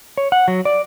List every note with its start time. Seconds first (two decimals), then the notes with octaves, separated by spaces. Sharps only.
0.18 C#5
0.32 F#5
0.48 F#3
0.65 D5